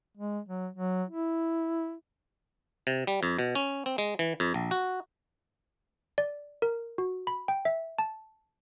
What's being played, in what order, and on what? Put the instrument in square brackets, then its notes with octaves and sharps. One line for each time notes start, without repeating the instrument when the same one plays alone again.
[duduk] G#3
F#3
F#3
E4
[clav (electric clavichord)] C3
G3
F2
B2
C#4
C4
G#3
E3
F2
A#1
F#4
[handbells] D5
A#4
F#4
B5
G5
E5
A5